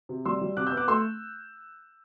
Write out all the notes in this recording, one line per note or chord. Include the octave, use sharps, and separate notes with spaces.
C3
G3 C6 E6
G3
C3 D6 F#6
E6 G6
B3
D6 F#6
A3 C6 E6